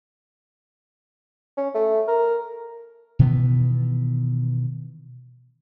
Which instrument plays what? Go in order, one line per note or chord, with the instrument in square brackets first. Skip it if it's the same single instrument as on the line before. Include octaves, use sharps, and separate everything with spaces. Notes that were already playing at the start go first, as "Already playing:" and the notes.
[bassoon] C#4
A3
A#4
[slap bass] B2 D#3 E3 B3